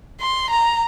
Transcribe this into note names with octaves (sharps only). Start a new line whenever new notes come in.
C6
A#5